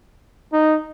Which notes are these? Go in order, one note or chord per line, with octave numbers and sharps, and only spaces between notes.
D#4